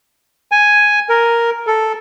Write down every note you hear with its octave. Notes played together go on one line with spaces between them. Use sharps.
G#5
A#4
A4